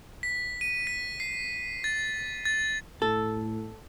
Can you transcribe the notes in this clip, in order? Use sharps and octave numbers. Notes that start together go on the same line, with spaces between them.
B6
D#7
B6
C7
A6
A6
A2 A4